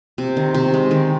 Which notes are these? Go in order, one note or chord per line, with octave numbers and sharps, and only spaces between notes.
C3
D#3
C3
G#3
D#3